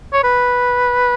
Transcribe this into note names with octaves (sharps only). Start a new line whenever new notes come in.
C#5
B4